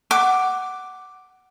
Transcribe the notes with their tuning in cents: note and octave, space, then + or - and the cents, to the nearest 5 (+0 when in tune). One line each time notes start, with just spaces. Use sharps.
F#5 +10 D6 +0